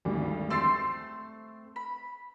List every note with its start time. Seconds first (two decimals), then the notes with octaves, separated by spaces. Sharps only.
0.05 G#1 D2 G2
0.50 A3 C4 C6 E6 A6 C7
1.76 B5